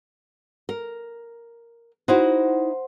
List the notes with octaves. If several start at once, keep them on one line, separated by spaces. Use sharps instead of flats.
A#4
D#4 E4 F#4 C5 F#5